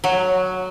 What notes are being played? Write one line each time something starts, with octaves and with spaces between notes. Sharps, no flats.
F#3